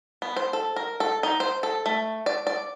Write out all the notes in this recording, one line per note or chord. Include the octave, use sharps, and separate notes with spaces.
B3
C5
A4
A#4
A4
D#4
C5
A4
A3
D5
D5